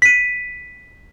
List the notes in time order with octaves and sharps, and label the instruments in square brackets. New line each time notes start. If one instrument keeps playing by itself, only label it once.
[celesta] B6 D#7